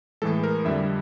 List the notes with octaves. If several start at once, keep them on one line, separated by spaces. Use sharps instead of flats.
A2 E3 G#3 A4
A#4
F2 D3 G3 E5